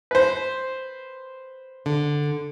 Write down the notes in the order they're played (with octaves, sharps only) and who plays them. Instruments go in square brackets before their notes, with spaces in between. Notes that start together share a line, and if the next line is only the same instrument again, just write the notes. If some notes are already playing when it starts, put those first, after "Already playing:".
[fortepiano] B4 C5
[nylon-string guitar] D3